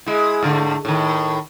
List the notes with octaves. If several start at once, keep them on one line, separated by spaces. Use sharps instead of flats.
G#3 E4
G#2 D3 A3
A2 D#3